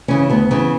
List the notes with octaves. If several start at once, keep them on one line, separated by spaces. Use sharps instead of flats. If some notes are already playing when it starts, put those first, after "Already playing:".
C#3 E3 C#4
D2 B3
C#3 E3